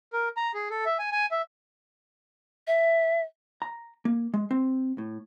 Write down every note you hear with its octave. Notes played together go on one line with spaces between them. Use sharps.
A#4
A#5
G#4
A4
E5
G#5
G#5
E5
E5
A#5
A#3
G#3
C4
A2